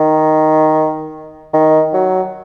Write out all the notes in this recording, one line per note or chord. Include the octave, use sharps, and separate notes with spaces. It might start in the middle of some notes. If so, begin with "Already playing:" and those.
Already playing: D#3
D#3
F#3